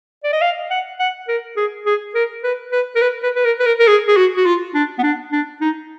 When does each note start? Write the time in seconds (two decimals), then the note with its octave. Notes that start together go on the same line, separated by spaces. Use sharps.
0.24 D5
0.33 D#5
0.42 F5
0.71 F#5
1.00 F#5
1.28 A#4
1.57 G#4
1.86 G#4
2.15 A#4
2.44 B4
2.72 B4
2.96 A#4
3.02 B4
3.23 B4
3.36 B4
3.45 A#4
3.60 B4
3.66 A#4
3.79 A#4
3.88 G#4
4.08 G#4
4.17 F#4
4.37 F#4
4.46 F4
4.75 D4
4.99 B3
5.03 D4
5.33 D4
5.61 D#4